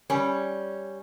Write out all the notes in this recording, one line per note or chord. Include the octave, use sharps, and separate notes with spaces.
G3 C#4